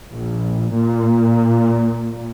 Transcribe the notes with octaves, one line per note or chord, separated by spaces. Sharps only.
A#1
A#2